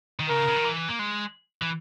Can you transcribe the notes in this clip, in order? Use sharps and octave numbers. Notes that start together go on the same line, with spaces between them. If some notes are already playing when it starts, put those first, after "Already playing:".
D#3
C#3 A#4
C#3
D#3
E3
A#3
G#3
E3